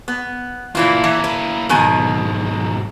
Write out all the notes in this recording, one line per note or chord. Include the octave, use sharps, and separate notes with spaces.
B3
A#2 E3 A#3 E4 F4
E3
B4
B1 G#2 B2 D#3 G#5